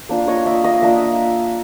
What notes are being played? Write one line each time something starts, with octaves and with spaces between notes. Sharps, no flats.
A#3 D4 F4
C#5 D#5
D5 E5
D#5 F5
A#3 D4 F4 D5 E5